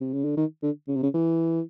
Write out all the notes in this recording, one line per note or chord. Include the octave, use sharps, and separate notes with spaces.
C3
C#3
D3
D#3
D3
C#3
C3
C#3
E3